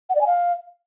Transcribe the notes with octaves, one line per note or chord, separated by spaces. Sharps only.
F#5
D5
G#5
F5